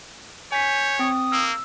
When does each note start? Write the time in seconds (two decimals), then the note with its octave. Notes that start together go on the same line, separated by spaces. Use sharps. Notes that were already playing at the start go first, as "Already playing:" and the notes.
0.52 C#5 G#5 G6 B6
0.99 C4 D#6
1.32 A#3 E6